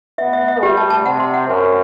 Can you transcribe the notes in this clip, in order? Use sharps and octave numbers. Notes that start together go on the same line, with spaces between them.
B3 E5
E5
E5
G3 G4
A5
A5
C3 F#5
C6
F#5
F#2 B4
B4